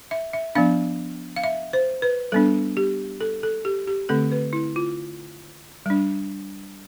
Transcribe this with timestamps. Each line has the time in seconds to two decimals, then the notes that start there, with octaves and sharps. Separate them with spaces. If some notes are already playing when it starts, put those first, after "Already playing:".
0.11 E5
0.33 E5
0.55 F3 B3 D4 F5
1.36 F5
1.44 E5
1.73 C5
2.02 B4
2.32 G3 B3 D4 A4
2.77 G4
3.21 A4
3.43 A4
3.65 G4
3.87 G4
4.09 D3 A3 C4 A4
4.32 B4
4.53 E4
4.76 F4
5.86 G3 D4